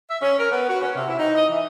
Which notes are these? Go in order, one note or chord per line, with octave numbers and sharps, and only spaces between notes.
E5
C#4
A#4
B3
F#4
C#4
C3
E4
D#4
D#5
E3